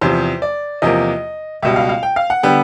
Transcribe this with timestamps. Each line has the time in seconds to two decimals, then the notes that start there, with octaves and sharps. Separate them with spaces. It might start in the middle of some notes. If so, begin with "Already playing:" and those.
0.01 E2 C3 F3 C5
0.42 D5
0.82 E2 C3 F3 A#3 D#5
1.63 C#2 B2 G3 E5
1.76 F5
1.89 F5
2.03 G5
2.16 F5
2.30 F#5
2.43 D3 G3 B3 G5